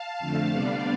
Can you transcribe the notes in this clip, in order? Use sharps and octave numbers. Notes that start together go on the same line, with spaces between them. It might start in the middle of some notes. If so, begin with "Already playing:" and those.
Already playing: F5 A5
F2 D3 A3
C3 G3 B3 D4 D5 F5